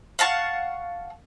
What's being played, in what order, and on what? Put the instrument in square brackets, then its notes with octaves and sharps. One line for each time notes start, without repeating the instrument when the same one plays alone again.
[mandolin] F5 F#5 A5 C#6